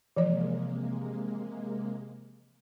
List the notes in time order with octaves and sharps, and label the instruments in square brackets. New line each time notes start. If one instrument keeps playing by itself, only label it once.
[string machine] C3 G#3 A#3 [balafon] E3 F3 C#5